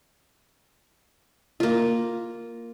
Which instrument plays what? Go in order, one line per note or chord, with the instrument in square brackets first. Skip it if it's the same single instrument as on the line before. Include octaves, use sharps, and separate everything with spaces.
[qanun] A#3 F4